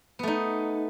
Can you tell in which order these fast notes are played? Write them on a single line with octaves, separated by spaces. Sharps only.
B3 A3 D#4